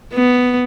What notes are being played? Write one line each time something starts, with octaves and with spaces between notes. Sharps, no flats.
B3